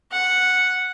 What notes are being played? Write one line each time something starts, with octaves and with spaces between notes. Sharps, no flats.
F#5